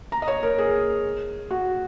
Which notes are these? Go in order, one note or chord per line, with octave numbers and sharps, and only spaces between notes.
A#5
D#5
C#5
A#4
G#4
F#4